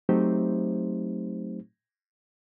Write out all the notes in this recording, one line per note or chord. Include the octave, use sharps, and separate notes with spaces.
F#3 A3 C4 D#4 G4 C5